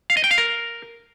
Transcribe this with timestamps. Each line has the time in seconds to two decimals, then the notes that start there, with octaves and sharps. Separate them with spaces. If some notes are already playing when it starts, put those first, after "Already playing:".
0.10 F5
0.17 D#5
0.24 G5
0.31 F5
0.38 A#4